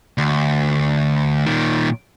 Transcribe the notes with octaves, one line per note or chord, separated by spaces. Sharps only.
D2
A#2 D#3